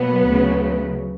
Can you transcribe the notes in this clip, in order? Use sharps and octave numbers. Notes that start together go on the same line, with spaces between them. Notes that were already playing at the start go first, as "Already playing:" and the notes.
Already playing: B2 F#3 A#3 B3
D2 C#3 F#3